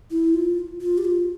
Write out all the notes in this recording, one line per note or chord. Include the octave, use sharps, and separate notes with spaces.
E4
F4
F4
G4
F4